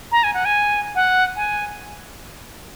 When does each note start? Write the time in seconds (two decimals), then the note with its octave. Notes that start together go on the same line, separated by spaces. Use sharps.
0.12 A#5
0.24 G#5
0.34 F#5
0.45 G#5
0.95 F#5
1.36 G#5